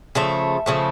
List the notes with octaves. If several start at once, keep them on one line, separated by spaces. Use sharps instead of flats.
C#3 F3 A3 E5
C#3 F3 A3